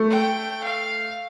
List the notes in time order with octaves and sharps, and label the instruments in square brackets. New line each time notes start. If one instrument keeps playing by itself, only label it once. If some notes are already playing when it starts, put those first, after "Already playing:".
Already playing: [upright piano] A3
[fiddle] G5
F5